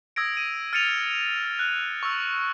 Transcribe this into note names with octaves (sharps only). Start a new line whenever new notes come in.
D#6 E6 G#6 A#6 D7
D#7
F6 A6 C#7 D#7 F7
F#6
C#6 E6